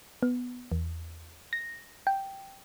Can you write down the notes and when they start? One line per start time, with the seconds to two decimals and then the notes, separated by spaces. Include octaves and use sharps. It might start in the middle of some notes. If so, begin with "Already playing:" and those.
0.23 B3
0.72 E2
1.53 A#6
2.07 G5